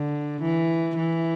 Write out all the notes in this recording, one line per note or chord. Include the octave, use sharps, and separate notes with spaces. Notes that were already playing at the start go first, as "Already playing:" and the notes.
Already playing: D3
E3
E3